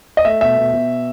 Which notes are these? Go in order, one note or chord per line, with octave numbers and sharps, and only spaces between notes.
D#5
A3 E5
B2 E5
B2
B2